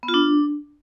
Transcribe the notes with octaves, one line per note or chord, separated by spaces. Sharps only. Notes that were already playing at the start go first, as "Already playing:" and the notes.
B3
F4
D4